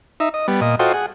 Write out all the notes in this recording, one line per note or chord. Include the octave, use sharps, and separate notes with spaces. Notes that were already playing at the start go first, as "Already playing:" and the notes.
D#4 E5
D#5
G3 B3
A#2 D#5
F4 F#4 A4 C5 D#5 G5
G#4 F#5